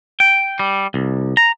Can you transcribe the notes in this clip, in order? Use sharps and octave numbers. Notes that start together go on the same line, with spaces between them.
G5
G3
C2
A#5